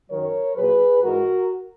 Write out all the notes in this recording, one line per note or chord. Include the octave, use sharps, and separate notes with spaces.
F#2 D#3 F#3 A#4 C#5
A#2 F#3 G#4 B4
G#2 E3 G#3 F#4 A#4